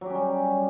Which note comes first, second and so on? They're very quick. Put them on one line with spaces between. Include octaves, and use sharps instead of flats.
F#3 G4 C#4 G3